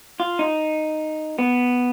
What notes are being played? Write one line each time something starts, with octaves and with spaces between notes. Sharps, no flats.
F4
D#4
B3